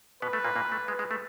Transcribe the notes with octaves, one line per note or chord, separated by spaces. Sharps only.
B2 B3 B4
A3
A#2 A#3
A#2 A#3
A3
G#3
G#3
A3